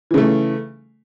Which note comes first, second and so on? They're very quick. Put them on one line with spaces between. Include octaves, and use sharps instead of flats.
E3 C#3 A3